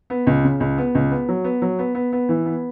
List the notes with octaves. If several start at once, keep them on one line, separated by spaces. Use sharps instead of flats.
B3
C#2
C#3
C#2
B3
C#2
B3
F#3
B3
F#3
B3
B3
B3
E3
B3